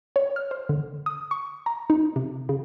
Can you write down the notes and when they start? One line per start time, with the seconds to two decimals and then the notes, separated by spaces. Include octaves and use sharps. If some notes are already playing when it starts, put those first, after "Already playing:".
0.16 C#5
0.36 F6
0.51 C5
0.69 D3
1.06 D#6
1.31 C#6
1.66 A#5
1.90 D#4
2.16 C3
2.49 C#3